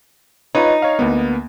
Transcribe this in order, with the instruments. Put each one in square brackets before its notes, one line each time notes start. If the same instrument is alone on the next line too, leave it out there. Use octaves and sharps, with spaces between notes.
[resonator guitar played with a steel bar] D#4 [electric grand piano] F4 B4 C#5
[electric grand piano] C#5 D#5 F5
D2 A#3 B3